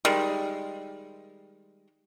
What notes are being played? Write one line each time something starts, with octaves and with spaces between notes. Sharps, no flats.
D#3 G3 G#3